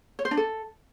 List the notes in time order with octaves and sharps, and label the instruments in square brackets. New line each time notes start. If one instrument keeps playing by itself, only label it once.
[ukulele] C#5
C5
D4
A4